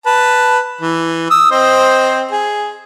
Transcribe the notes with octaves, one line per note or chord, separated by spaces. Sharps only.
B4 A5
E3
D#6 E6
C4 C5 D#5
G#4